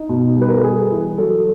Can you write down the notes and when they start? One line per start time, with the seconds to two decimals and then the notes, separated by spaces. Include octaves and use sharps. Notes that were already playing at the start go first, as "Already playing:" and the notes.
Already playing: D#4
0.09 B2
0.36 G3
0.41 B4
0.49 A#4
0.56 A4
0.64 G3 G#4
0.91 E3
1.18 F#3 A4